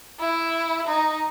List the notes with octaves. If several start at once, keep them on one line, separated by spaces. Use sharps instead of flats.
E4
D#4